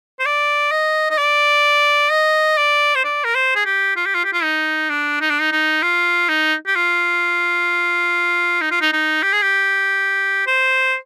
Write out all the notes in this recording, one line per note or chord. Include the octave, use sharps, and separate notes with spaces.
C5
D5
D#5
D#5
D5
D#5
D5
C5
D5
A#4
C5
G#4
G4
F4
G4
F4
G4
F4
D#4
D4
D#4
D4
D#4
D#4
F4
D#4
G4
F4
D#4
F4
D#4
D#4
G4
G#4
G4
C5